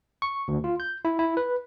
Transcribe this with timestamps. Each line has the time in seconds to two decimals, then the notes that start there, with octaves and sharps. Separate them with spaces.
0.22 C#6
0.48 D2
0.64 F4
0.80 G6
1.05 E4
1.19 E4
1.37 B4